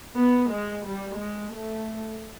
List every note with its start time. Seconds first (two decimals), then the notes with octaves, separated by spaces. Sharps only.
0.18 B3
0.52 G#3
0.86 G3
1.20 G#3
1.53 A3